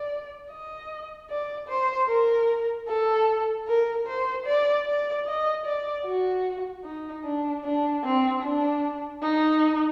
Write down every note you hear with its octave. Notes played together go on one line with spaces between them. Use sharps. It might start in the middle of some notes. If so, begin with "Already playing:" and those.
Already playing: D5
D#5
D5
C5
A#4
A4
A#4
C5
D5
D5
D#5
D5
F#4
D#4
D4
D4
C4
D4
D#4